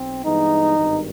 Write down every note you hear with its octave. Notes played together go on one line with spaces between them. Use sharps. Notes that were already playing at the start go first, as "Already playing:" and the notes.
Already playing: B1 C4
G2 E3 G#3 B3 D#4
G#1 G2 D#3